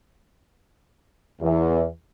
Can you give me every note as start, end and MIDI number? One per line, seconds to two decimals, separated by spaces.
1.41 1.84 40